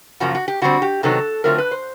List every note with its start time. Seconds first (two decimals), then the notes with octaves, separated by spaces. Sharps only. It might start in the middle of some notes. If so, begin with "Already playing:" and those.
0.20 F#2 C#3 F3 A#3 F#4
0.35 F#4
0.48 G4
0.62 D3 G3 C4 F#4
0.82 G4
1.03 C3 D#3 F#3 B3 D#4 A4
1.44 D3 F#3 A3 C4 F4 A#4
1.58 B4
1.71 C5